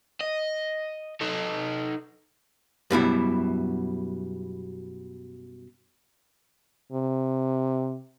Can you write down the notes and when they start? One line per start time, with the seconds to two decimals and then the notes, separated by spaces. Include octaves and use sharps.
0.21 D#5
1.21 D#4 A4
2.91 F#2 B2 G3 E4
6.92 C3